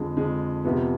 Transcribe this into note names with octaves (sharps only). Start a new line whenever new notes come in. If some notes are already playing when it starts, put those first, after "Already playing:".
Already playing: F2 D3 F3 G#3
F2 D3 F3 G#3
F2 C3 F3 B3